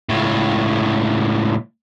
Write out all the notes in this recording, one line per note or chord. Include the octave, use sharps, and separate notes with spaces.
C#2 A2